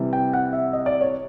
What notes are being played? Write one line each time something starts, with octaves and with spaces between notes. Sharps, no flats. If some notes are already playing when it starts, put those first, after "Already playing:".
Already playing: C3 E3 G3
G5
F#5
E5
D#5
D5
C#5